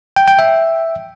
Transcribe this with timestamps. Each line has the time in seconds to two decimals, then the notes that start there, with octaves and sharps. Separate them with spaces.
0.16 G5
0.28 G5
0.39 E5